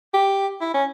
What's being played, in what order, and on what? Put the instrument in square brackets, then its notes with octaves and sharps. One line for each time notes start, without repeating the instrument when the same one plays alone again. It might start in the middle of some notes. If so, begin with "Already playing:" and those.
[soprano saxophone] G4
E4
C#4